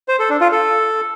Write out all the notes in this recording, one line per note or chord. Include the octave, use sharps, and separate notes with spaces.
C5
A4
D4
F4
A4